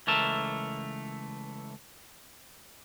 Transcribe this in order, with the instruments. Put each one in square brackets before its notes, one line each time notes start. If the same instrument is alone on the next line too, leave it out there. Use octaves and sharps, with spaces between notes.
[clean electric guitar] C#2 E3 A3 A#4 A5